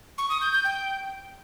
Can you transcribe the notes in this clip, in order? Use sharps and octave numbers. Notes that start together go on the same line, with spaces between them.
C#6
D#6
G6
G6
G5